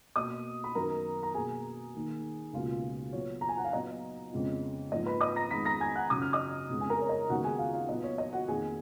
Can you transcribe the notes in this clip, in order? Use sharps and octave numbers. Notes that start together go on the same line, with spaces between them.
B2 A#3 D#5 D#6
B5
F#2 D#3 F#3 B3 A#4 A#5
A#5
B2 A#3 G#4 G#5
D#2 D#3 A#3
C#2 B2 A#3 F4 F5
A#2 F#3 B3 C#5
A#5
G#5
F#5
F5
A#2 F#3 B3 D#5
F2 C#3 G#3 B3
G#2 F3 A#3 D#5
B4 B5
D#5 D#6
A#5 A#6
F2 D#3 G#3 B3 B5 B6
A#5 A#6
G#5 G#6
F#5 F#6
F#2 C#3 F#3 D#6
F6
D#5 D#6
F2 C#3 G#3 B3
G#5
A#4 A#5
C#5
D#5
D#2 C#3 G#3 B3 F#4 F#5
G#4 G#5
F4 F5
F4 F5
A#2 F#3 B3 D#5
C#5
D#5
F#4 F#5
F2 D#3 A#3 G#4 G#5